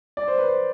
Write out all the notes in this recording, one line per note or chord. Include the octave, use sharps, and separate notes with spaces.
D5
C5
B4
C5